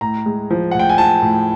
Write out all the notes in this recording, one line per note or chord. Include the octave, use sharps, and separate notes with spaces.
A2 A#5
G#3
F3
A2 F#5
G5
G#5
F3 A5
A2